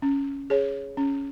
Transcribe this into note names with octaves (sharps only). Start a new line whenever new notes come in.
C#4
G#4 C#5
C#4